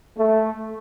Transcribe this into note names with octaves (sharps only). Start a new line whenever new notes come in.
A3